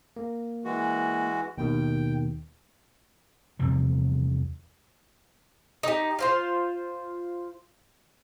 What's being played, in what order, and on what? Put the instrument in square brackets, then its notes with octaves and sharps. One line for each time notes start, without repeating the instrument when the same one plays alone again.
[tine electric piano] A#3
[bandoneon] E3 G#3 F#4
[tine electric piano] D#2 B2 D#3 [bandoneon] G5
[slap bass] E2 C3 F3 G3
[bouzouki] D#4 G4
F4 C5 F5